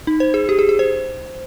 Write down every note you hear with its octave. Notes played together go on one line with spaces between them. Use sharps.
D#4
C5
G#4
G4
G#4
G#4
C5